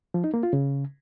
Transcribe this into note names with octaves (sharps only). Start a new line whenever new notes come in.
F3
D#4
A#3
F4
C#3